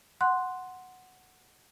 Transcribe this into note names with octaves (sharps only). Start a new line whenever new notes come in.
F#5 C6 F#6